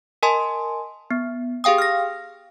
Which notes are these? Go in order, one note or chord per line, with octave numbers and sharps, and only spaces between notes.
A#4 D#5 G#5 A5 C6
B3
G4 G#4 F5 G5 D#6
F6 A#6